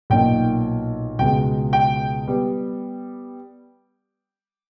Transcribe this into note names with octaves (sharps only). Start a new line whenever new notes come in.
B1 A#2 A#3 D#4 G5
C#2 B2 G#3 G5
G5
G3 B3